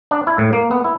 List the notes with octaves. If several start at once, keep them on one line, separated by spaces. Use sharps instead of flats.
D4
E4
A2
A#3
B3
E4